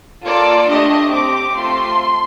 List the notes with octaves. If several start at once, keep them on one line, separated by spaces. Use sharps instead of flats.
A#3 F4 A4 D5
A3 D4 G4 D#5
C4 G4 D6
A3 C4 F4 A4 C6